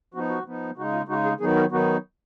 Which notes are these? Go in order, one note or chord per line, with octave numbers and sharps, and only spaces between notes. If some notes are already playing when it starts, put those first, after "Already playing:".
F3 B3 D#4 F#4
F#4
F3 B3 D#4
C#3 G#3 D#4 F#4
F4
C#3 G#3 D#4 F#4
G#4
D#3 F#3 B3 D#4 G#4
A#4
D#3 F#3 B3 D#4 F#4